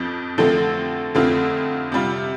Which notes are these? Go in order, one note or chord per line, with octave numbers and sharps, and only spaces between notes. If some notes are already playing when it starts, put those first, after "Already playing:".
Already playing: F2 F3
D3 F3 A3 C4
F2 D3 A3 C4 F4
C3 G3 F4